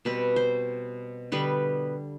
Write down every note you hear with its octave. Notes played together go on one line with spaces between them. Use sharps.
B2 G3 C4 B4
C5
D3 G3 B3 B4